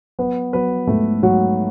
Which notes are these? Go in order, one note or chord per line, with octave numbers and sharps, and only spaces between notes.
F#3 B3 B4
F#3 B3 B4
G#2 A3 A4
G#2 F#3 F#4